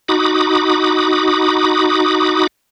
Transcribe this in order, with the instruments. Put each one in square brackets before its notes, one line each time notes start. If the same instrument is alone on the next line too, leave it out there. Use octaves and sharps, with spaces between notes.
[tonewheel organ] D#4 F#4 B5 D6 D#6